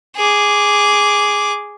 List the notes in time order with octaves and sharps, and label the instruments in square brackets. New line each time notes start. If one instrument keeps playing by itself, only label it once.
[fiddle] G#4 D6